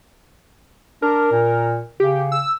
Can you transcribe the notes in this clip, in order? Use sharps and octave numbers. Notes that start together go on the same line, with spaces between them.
D4 A#4
A#2
C#3 G4
E6